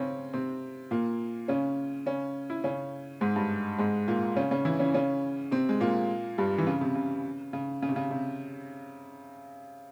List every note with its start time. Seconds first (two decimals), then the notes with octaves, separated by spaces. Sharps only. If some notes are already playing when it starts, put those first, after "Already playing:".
Already playing: C#3 C4 C#4
0.33 C3 C4
0.91 A#2 A#3
1.48 C#3 C#4
2.06 C#3 C#4
2.50 E4
2.64 C#3 C#4
3.21 G#2 G#3
3.36 G2 G3
3.78 G#2 G#3
4.08 A#2 A#3
4.36 C#3 C#4
4.51 C#3 C#4
4.65 E3 E4
4.79 C#3 C#4
4.94 C#3 C#4
5.52 C3 C4
5.69 G#3
5.80 A#2 A#3
6.38 G2 G3
6.58 E3
6.67 C#3
6.81 C3
6.95 C#3
7.53 C#3
7.82 C#3
7.89 C3
7.96 C#3
8.11 C3